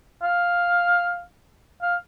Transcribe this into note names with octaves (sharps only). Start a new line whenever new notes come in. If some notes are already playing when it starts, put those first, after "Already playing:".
F5
F5